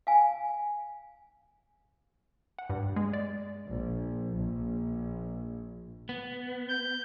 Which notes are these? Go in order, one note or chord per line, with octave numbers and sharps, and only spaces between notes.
F5 G#5
F#5
G2
G#3
D5
A#1
A#1
B3
G6